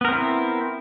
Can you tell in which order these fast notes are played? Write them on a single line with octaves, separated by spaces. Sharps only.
B3 A#4 C4 E4